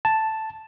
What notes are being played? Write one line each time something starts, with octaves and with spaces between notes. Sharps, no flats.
A5